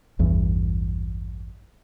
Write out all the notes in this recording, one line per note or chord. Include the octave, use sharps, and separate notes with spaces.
A1 E2 G2 E3